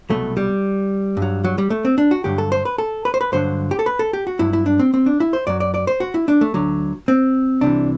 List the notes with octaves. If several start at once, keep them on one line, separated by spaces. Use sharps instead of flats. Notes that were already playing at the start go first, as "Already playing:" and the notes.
C2 B2 F#3 A3
G3
G2
F#3
F#3
G3
A3
C4
D4
F#4
G2 D3 F#3 G4
A4
C5
B4
A4
B4
C5
B4
G2 D3 F#3 C5
G4
A4
B4
A4
G4
F#4
G2 F#3 E4
E4
D4
C4
C4
D4
E4
C5
F#2 F#3 D5
D5
D5
C5
F#4
E4
D4
A3
D2 D3 F#3
C4
C2 C3 E3 D4